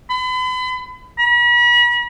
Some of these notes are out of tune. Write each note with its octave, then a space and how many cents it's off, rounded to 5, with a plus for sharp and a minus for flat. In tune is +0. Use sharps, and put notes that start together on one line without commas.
B5 +40
B5 -40